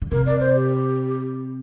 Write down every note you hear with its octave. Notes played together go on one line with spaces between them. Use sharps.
D3
C3 A#4
D5
C5
G4